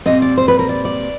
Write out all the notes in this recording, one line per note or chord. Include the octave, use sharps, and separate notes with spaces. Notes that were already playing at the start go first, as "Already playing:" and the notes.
A#2 G3 C4 D#5
D5
C5
B4
A#4
D5
D5